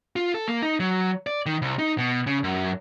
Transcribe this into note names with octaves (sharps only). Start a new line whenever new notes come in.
F4
A4
A#3
D#4
F#3
D5
D#3
C2
D#4
B2
C#3
F#2